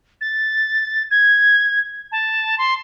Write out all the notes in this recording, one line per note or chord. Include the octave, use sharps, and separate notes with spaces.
A6
G#6
A5
C6